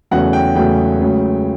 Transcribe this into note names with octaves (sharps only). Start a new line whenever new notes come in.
E2 C#3 F#3 A3 F#5
G5
E2 C#3 F#3 A3 G5
C#2 C#3 F#3 A3